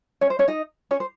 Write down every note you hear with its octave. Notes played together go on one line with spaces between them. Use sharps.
C#4 C#5
C5
C#4 C#5
D#4 D#5
C#4 C#5
C5